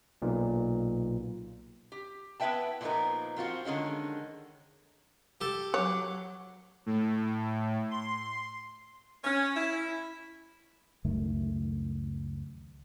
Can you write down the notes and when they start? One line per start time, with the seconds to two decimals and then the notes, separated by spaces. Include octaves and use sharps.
0.22 B1 A#2
1.92 G4
2.40 B3 E4 B4 E5 G5 A5
2.81 A#2 F3 G3 B3 D#4 A#4
3.36 F3 C4 F4 F#4
3.65 D3 D#3 G#3 C#4
5.41 G4 A4
5.74 F#3 C#5 F#5 D6
6.86 A2
7.91 C6
9.24 C#4
9.55 E4
11.05 C#2 F#2 D#3 A3